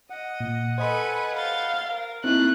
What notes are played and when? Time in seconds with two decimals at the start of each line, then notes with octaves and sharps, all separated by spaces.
0.10 D#5 F#5
0.40 A#2
0.78 A4 B4 C5 D#5 G#5 B5
1.35 F5 G6 A6
1.90 A#4 F6
2.24 A3 A#3 C4 D#4 E4 F#6